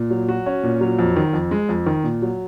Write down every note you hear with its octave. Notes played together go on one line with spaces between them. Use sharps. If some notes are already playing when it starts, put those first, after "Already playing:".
Already playing: A#2
F#3
F#4
C#4
A#2
F#3
F2
D#3
F2
G#3
F2
D#3
A#2
F#3